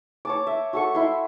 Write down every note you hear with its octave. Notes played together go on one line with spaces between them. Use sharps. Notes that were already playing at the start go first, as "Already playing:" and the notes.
C#5 A5 D6
E5
F#4 A4 C#6
E4 C6